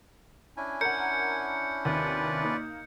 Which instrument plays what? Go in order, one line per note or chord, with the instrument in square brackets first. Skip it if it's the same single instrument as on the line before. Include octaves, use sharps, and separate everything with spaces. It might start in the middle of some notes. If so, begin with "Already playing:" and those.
[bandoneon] C#4 D4 E4 [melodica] G#5
[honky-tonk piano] A#4 F#5 [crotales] G6 C#7
[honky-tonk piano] D#2 C3 [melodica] F4 B4 D5
[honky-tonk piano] A#3 D#4